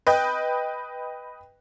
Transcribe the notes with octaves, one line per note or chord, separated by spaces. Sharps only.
B4 D#5 G5